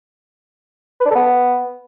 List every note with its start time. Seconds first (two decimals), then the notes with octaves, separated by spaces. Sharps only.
1.00 B4
1.05 D4
1.10 A4
1.15 B3